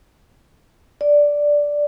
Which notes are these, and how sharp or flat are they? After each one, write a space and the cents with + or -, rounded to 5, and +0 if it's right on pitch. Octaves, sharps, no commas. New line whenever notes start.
D5 -5